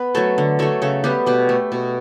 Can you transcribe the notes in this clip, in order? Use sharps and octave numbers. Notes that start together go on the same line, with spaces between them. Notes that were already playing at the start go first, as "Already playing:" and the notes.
Already playing: B3 B4
F#3 A3 A4 C#5
D3
F#3 A3 A4 C#5
C#3 A4 C#5
G3 B3 G4 B4
B2 G4 B4
A3
B2